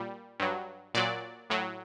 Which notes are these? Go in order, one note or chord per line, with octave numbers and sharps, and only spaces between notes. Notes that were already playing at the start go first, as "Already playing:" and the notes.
Already playing: A#2 G3
G2 F#3
A#2 F#3 D5
A2 F#3